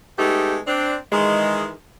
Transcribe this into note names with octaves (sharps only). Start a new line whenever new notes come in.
G#3 A3 B3 D#4 G4
C4 D4
D#3 E3 G#3